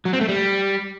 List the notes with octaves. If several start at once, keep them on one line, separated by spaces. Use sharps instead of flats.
F#3
C4
A3
G3